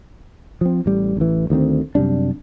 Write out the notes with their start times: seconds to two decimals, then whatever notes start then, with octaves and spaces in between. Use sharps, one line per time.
0.61 F3 C4
0.86 A1 G3
1.17 A1 E3
1.50 D2 D#3 A3 C4
1.95 F#2 C3 G3 D4